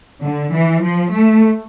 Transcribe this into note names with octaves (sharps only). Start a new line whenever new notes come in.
D3
E3
F3
A3